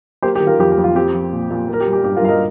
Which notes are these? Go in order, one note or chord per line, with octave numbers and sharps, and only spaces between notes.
A#3 G4 C5
G4
D#3
F4 A#4
F2 G4
G4
F2
F4
C4 G4
F3
A#2
A#2
A#3
A#4
G4
G3
G4
G2 G4
F4 A#4
G2 F5
A#4 D#5